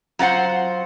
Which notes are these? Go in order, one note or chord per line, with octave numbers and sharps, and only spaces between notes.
F#3 F4 C5 F#5